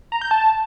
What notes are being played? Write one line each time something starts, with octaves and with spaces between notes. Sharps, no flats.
A#5
G6
A5